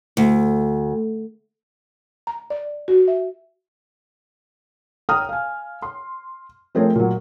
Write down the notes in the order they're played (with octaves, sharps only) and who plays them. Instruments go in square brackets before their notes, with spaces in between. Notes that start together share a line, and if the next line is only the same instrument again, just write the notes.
[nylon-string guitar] D2
[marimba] A#5
D5
F#4
E5
[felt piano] G5 A#5 D#6 F6
F5 G#5
C6
F3 A3 C4 G#4 A#4 C#5
A#2 F#3